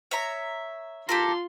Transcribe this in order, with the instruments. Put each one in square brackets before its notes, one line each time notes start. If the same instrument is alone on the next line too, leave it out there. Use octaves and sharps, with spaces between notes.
[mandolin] C#5 E5 A#5
[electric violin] F4 C6 [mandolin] G4 A4 A#4